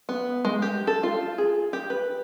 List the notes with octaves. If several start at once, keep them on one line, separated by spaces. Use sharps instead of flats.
B3
G#3
G4
A4
F4
G#4
G4
B4